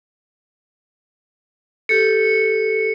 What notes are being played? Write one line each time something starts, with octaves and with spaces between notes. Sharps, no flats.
G4 A4 C#7